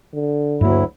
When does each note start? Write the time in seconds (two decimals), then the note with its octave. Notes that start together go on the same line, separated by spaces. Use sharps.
0.14 D3
0.61 D2 G2 F#3 A#3 E4